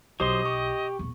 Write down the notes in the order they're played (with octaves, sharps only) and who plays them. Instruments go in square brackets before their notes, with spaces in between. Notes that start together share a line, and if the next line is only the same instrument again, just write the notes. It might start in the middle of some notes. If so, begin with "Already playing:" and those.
[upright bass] B1 [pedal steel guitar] F#3 C5 C6 [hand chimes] G4 D6 D#6 [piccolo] D#5
[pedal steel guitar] G4 [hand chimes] C#6
[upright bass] E2 A#2